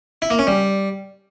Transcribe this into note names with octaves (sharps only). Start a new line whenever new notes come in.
E4
A#3
C#4
G3